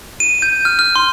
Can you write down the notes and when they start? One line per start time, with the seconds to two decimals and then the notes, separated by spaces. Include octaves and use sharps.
0.20 D#7
0.42 G6
0.65 F6
0.79 F6
0.96 C6